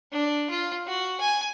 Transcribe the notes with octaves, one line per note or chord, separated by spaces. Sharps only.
D4
F4
F#4
G#5